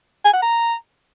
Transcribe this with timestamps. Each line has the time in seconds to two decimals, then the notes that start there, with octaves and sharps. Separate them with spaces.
0.25 G#5
0.33 F#5
0.42 A#5